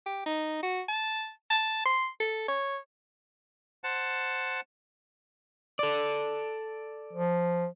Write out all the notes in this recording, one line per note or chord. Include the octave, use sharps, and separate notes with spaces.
G4
D#4
F#4
A5
A5
C6
A4
C#5
C5 F#5 A5
A4 D5
F3